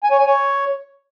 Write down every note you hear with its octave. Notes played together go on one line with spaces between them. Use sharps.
G#5
C#5
G#5
C#5